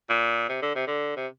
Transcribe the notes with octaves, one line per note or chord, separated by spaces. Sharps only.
A#2
C3
D3
C3
D3
C3